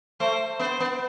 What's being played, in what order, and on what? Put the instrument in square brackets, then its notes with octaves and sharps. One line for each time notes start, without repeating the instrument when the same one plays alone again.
[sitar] A3 [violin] C5
[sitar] B3 [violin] C5
[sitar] B3